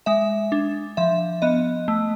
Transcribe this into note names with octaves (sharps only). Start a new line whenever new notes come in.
G#3 E5
D4
F3 E5
B3 D#5
A3